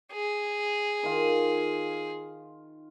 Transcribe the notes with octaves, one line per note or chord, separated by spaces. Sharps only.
G#4
D#3 F4